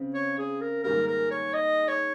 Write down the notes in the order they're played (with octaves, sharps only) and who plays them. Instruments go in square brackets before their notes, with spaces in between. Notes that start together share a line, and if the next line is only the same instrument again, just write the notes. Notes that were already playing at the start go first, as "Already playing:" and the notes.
Already playing: [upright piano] C#3 C4
[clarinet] C#5
G#4
A#4
[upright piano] G#2 D#3 G3 A#3 [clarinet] A#4
[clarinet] A#4
C#5
D#5
C#5